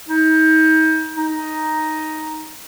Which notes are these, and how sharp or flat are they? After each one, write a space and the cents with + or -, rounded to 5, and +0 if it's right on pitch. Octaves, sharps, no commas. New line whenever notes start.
D#4 +35
D#4 +5